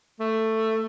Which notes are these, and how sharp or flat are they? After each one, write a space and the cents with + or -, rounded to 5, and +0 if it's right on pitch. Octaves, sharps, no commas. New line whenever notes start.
A3 +10